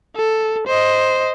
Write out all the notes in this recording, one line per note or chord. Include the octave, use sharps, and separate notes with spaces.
A4
C5 D#5